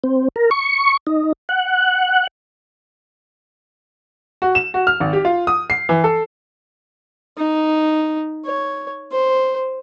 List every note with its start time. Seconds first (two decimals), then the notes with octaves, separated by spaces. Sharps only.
0.04 C4
0.36 A#4
0.51 C#6
1.07 D#4
1.49 F#5
4.42 F#4
4.55 E7
4.74 F#4
4.87 F6
5.00 G#1
5.13 G4
5.25 F4
5.47 D#6
5.70 C7
5.89 E3
6.04 A4
7.38 D#4
8.45 C#5
9.11 C5